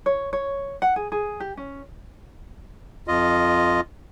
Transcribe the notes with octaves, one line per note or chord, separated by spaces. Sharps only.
C#5
C#5
F#5
G#4
G#4
G4
C#4
F2 F4 D#5